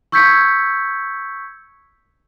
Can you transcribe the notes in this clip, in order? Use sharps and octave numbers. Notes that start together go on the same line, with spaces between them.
C#6 E6 G6 G#6 B6 C#7